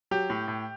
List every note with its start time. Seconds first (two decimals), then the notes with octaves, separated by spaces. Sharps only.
0.11 F#3 G4
0.30 A2
0.48 A2